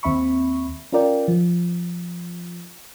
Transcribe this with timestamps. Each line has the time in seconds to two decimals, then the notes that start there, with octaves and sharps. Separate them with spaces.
0.03 D#2 C4 E5 B5 C#6
0.92 C#4 F4 A#4 D5 G5
1.28 F3